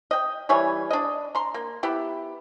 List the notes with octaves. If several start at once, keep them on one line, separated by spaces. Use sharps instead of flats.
D#5 G5
E3 G3 C#5 G#5
D4 D#5
A#5 C6
A#3
B3 E4 G4